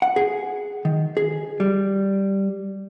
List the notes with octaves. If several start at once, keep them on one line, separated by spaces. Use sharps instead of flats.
F#5
G#4
D#3
G#4
G3